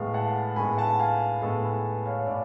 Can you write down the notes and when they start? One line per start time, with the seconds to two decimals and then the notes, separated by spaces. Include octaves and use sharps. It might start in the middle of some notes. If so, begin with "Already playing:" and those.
Already playing: A2 G#3 B3 F5
0.14 F#5 A5
0.56 A2 G#3 B3 G#5 B5
0.78 F#5 A5
0.99 F5 G#5
1.42 A2 G#3 B3 A4
1.63 B4
2.06 C#5 F5
2.27 A2 B4 D5